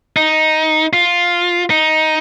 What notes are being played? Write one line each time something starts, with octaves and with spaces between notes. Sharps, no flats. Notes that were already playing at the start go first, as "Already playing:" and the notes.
D#4
F4
D#4